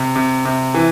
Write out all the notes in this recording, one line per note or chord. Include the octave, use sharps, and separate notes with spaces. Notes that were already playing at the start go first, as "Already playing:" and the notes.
Already playing: C3
C3
C3
E3